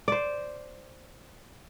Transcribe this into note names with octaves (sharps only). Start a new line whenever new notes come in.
C5 D5